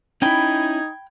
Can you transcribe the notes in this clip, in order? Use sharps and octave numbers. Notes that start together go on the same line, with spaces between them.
C#4 D#4 E4 G5 B5 G#6